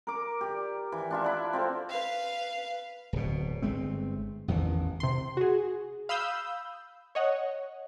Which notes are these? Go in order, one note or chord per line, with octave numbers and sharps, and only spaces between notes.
A#4 D6
G4 D5
E3
D4 F4 E5
E4 F#5
C4 F4 A4
B4 F5
D1 B2
G1 G#3 A3 C4
A1 E2 D#3 E3
C3 C6
F#4 G#4
F5 B5 D#6 E6 G6
C#5 D#5 F#5